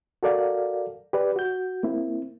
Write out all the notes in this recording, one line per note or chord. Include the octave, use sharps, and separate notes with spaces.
F#4 A4 A#4 D5 F5
G4 B4 D5
F#4 G6
A#3 C4 E4